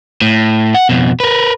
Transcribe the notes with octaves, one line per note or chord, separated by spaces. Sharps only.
A2
F#5
F2 B2
A#4 B4